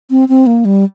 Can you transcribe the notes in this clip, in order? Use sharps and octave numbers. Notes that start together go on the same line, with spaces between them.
C4
C4
A#3
G3